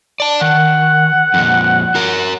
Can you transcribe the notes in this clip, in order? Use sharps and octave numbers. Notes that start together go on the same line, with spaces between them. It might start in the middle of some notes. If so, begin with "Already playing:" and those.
D5 A5
D#3 F#5
F2 A#2
F#4 A#4